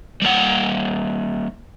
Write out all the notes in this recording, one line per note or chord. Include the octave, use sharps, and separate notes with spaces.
G3 A#3 F#5